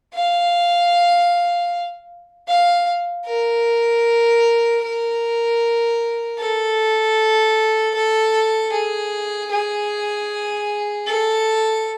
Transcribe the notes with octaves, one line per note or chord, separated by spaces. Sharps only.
F5
F5
A#4
A#4
A4
A4
G#4
G#4
A4